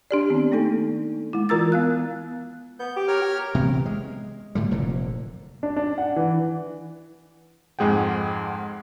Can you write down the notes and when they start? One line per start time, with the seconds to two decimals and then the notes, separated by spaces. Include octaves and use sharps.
0.11 D4 G4 D5
0.30 D#3 B3 C4
0.52 A3 A#3 D#4 A4
1.33 G#3 E4
1.49 E3 F4 A#4 A#5 E6 A6
1.72 B3 F5 F#6
2.79 B3 G6
2.96 G4
3.08 A#4 C#5 F6
3.22 G4
3.55 C3 E3 B3
3.86 G#3
4.55 A2 D3 G3
4.71 F1 A#2 D3
5.63 D4
5.76 D4
5.98 F#5
6.16 E3
7.79 F2 G#2 G#3 G#4 F#5 G5